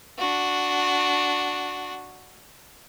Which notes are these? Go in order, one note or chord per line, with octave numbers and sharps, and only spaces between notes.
D4 F#4